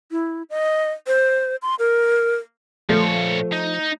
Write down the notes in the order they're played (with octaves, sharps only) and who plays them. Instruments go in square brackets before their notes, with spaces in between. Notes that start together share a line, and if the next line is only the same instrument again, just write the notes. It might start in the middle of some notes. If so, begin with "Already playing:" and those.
[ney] E4
D#5
C5
C6
A#4
[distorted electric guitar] A#2 C#5 [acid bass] F3 [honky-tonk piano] A3
[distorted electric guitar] D#4